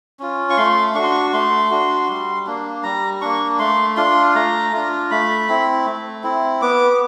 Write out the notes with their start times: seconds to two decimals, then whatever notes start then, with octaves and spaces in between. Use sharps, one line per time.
0.19 C#4 F4
0.50 C#6
0.57 A3 C6
0.94 D4 C#6
0.99 F#4 C6
1.11 C#6
1.33 A3 C6
1.71 D4 F#4
2.09 G3
2.46 A#3 D4
2.83 G3 A#5
3.21 A#3 D4 C#6
3.59 A3 C6
3.97 D4 F4 C6
4.35 A3 A#5
4.73 D4 F4
5.11 A3 B5
5.49 C4 E4
5.85 A3
6.23 C4 E4
6.62 B3 D6
6.91 D6